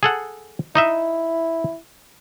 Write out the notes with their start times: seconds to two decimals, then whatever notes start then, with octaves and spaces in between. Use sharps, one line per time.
0.03 G#4 A4 F#5
0.75 D#4 E4 D#5 E5